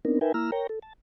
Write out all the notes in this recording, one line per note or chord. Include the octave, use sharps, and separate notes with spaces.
B3 C4 D4 D#4 A#4
D#4 A#4 B4 E5 G5 G#5
A#3 E4 A#5 E6 F6
A#4 C#5 G5 A#5
A4
A5